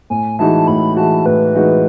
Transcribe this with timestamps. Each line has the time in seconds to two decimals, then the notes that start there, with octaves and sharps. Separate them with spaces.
0.10 A2 G#5
0.39 E3 G#3 D#4 F#4 A5
0.68 A2 B5
0.96 E3 G#3 D#4 F#4 A5
1.26 A2 B4
1.54 E3 G#3 D#4 F#4